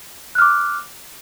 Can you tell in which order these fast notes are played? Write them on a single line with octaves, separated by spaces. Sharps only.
F#6 F6 D6